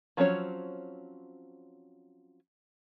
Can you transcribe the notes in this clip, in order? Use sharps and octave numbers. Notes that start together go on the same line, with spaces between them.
F3 F#3 C4 C#4 C#5